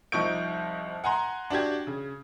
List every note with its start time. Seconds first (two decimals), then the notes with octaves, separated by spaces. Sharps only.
0.12 C2 F3 D#4 C#6 G6 D7
1.04 F#5 G#5 A#5 C6
1.50 D4 F#4 G4 G#6
1.87 C#3